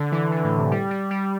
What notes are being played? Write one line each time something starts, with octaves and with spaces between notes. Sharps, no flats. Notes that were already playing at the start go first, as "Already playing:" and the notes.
Already playing: D3
E3
D3
A2
C3
G3
G3
G3